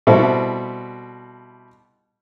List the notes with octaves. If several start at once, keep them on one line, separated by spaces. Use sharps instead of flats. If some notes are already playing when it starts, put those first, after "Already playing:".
B2 G3 C4 E4 A4